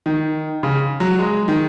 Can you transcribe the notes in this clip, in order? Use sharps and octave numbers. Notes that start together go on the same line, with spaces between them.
D#3
C#3
F#3
G#3
D#3